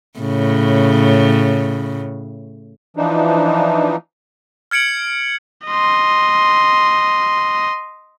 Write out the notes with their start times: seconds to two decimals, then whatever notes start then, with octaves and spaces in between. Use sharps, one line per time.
0.19 A2 C#3
2.97 E3 F3 D4 D#4
4.71 F6 G#6 C#7 D7 F#7
5.67 D#5 C6